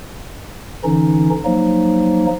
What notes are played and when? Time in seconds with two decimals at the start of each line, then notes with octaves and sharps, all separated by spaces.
0.84 D3 E3 C#4 D#4
1.45 F3 F#3 A#3 D#4